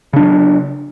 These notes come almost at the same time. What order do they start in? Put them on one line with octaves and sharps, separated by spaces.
C#3 D4 F#3